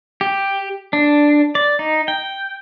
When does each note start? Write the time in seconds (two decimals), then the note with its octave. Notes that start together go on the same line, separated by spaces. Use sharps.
0.21 G4
0.93 D4
1.55 D5
1.79 D#4
2.08 G5